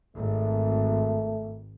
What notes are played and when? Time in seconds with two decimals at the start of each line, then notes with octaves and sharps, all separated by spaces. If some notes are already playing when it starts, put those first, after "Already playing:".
0.16 G#1 A3